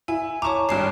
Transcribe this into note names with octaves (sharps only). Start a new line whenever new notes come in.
E4 G#5
C#5 A5 A#5 C#6 D6
G#1 G2 C7 E7